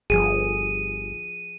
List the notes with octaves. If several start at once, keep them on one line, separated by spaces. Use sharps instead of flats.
G1 F3 G#4 D#7